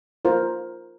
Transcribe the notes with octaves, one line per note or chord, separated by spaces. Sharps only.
F4 A#4 C5